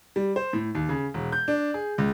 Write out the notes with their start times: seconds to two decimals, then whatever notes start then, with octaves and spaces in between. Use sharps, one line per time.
0.16 G3
0.36 C5
0.53 A2
0.75 D#2
0.89 C#3
1.14 E1
1.32 G6
1.48 D4
1.74 G#4
1.98 C#2